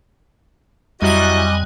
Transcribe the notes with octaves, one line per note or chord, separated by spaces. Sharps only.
F2 F#3 G3 E4 F#4 D#5 G#5 F#6